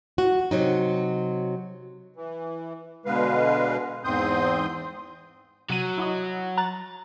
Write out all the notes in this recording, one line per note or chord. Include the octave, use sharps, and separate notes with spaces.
F#4
C3 F#3 D#4
E3
B2 D3 G#3 B4 F5
E2 G#2 C4 C6 D#6 G6
C3 F#3 D#7
E4 F#4 D#5
A#5 F#6 A6